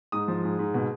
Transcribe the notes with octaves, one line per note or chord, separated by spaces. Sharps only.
G#2 D#6
F3
G#2
G#2
B2